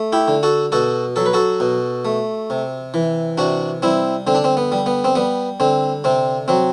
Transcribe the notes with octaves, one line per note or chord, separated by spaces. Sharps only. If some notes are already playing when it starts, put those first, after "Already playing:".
Already playing: A3
E4 G4
D3
F#4 A4
B2 F#4 A4
F#3 A4
B4
F#4 A4
B2
A3
C3
E3
C3 D4 F#4
G3 C4 E4
D3 C4
D4
C4
B3
G3
B3
C4
G3 B3
D3 C4
C3 C4
F#3 C4